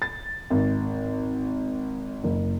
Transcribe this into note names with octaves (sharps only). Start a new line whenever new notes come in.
A6
G#1
F#1